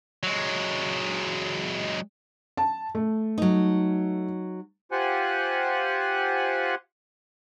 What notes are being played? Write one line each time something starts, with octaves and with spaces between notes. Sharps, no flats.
F#3 G#3
A5
A3
F#3 D#4
F4 G4 C5 F#5 G#5 F#6